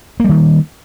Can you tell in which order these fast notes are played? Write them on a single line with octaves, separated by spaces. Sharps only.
A#3 G3 D#3